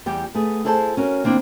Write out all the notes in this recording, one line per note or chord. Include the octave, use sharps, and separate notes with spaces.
E2 G3 G4
A3 B3 G#4
E4 G#4 A4 C5 D5 A5
C#4 F#4 A#4
D#3 A#3 C4 D4 E4